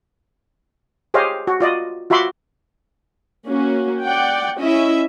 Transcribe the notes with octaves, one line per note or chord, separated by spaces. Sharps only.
G4 G#4 C5 C#5 D#5 F5
F#4
F4 D5 D#5
F4 F#4 E5 B5 C6 D6
A#3 C#4 F#4
D5 F#5 G5
C#4 E4 D#5 E5